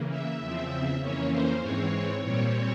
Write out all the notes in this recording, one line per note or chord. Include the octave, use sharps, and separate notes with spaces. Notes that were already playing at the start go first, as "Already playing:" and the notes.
Already playing: C#3 E3 A#3
E5
E2 C#3 F3 C4 E5
F2 E3 A#3 C#4 C#5
C5
G#2 E3 G#3 C4 C#5
A#2 G3 C4 C#5